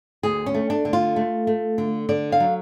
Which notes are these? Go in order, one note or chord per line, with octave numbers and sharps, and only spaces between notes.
D2 G#4
C#4
A3
D4
D3
F4
A3
A3
D3
D3 D5
F5
F#3